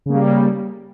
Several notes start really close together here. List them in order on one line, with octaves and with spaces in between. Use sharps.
C#3 A#3 G3